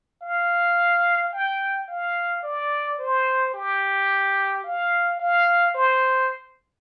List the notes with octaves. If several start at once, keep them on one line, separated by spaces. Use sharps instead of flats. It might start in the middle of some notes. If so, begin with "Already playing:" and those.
F5
G5
F5
D5
C5
G4
F5
F5
C5